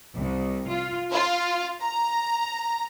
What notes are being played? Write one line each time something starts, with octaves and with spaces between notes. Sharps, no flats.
C2
F4
F4
A#5